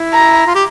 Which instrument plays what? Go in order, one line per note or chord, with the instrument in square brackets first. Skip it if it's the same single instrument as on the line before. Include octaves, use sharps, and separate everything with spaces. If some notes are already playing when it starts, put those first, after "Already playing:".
Already playing: [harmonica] E4
[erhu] A#5
[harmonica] F4
G4